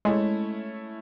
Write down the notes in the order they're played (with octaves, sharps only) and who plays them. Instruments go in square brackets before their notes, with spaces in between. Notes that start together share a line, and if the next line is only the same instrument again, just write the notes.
[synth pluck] G#3 [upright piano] A3 C#4 E4